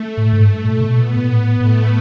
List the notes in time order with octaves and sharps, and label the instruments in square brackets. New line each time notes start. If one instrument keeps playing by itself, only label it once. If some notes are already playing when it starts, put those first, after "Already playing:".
Already playing: [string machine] A3
[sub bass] A2
G#2
G2
A#2
B2
[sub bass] A#2 [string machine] B3
[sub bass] A#2
A2
[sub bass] A2 [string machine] A3